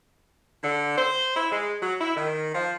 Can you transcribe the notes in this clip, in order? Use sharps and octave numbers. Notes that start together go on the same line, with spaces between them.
D3
C5
E4
G#3
F#3
E4
D#3
F3